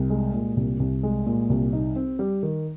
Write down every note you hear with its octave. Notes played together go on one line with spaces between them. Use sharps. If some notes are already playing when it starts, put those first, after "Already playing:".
Already playing: C2
G#3
A#2
C2
C2
G#3
A#2
C2
D#4
C4
G3
D#3